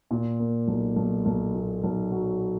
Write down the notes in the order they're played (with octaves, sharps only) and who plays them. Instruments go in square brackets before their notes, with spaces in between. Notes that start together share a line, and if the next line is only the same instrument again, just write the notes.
[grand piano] A#2
A#3
B1
B1
B1
A#2
B1
F#3